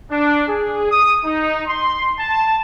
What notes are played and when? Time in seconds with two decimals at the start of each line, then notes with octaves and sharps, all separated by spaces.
0.11 D4
0.49 G#4
0.91 D#6
1.25 D#4
1.67 C6
2.19 A5